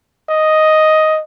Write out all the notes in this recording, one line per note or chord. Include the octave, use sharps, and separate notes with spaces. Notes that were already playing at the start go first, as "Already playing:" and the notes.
D#5